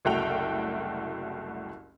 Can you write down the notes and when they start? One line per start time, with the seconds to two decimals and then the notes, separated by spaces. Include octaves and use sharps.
0.05 F#1 C2 A3 F#4 G5 F7